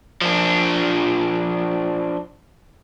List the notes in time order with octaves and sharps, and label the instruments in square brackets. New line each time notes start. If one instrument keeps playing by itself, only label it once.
[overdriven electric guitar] F3 D4